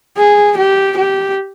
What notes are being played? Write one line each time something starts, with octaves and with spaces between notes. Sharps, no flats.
G#4
G4
G4